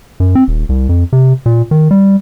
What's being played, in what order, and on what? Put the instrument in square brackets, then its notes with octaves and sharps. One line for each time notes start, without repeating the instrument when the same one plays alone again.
[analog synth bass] F#2
C4
D#1
C2
F2
C3
A#2
D#3
G3